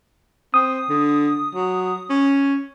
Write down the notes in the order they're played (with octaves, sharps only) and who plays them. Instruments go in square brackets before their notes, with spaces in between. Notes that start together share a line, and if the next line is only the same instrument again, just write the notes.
[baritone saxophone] C4 [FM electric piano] D#6
[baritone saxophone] D3
F#3
C#4